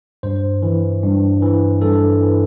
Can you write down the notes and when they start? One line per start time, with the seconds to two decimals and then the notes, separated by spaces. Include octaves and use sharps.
0.23 G2 C5
0.62 E3
1.03 G2
1.42 E3
1.81 G2 A4
2.21 E3